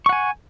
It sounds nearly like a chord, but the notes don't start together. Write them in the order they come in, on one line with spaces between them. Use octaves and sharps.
C#6 F#5 G#5